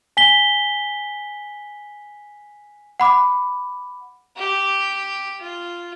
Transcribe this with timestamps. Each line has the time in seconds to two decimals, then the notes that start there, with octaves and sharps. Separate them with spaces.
0.17 G#5 B6 G7
3.00 F#5 B5 D6
4.37 G4
5.40 F4